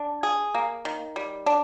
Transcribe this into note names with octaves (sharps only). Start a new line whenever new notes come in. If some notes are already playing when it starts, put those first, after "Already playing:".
Already playing: D4
G#4
A#3
D#3
G3
D4